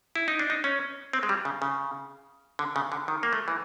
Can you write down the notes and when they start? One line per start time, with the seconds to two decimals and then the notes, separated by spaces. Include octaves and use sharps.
0.16 E4
0.28 D#4
0.39 D4
0.50 D#4
0.64 C#4
1.13 C4
1.23 G#3
1.29 G3
1.45 C#3
1.62 C#3
2.59 D3
2.76 C#3
2.92 D3
3.08 D#3
3.23 A#3
3.33 A3
3.48 E3